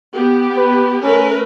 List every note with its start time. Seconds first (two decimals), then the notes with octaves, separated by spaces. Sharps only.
0.14 B3 G4
0.57 B4
1.02 A3 C#4 A#4 B4